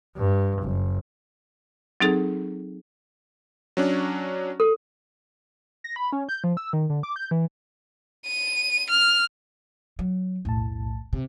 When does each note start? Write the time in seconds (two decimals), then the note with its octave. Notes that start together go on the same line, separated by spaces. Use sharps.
0.17 G2
0.62 F#1
2.01 F#3 C4 D#4 G#4 A4
3.77 F#3 C#4 D4
4.60 A4
5.84 A#6
5.96 B5
6.13 C#4
6.29 G6
6.44 F3
6.57 E6
6.73 D#3
6.89 D3
7.03 D6
7.16 G6
7.31 E3
8.27 D#7
8.90 F6
9.99 F#3
10.45 B1 E2 A2 A5
11.13 C3